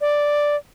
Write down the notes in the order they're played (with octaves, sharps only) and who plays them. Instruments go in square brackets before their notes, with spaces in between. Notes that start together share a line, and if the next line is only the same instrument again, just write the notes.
[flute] D5